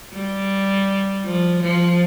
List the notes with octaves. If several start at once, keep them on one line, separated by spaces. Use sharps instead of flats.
G3
F3
F3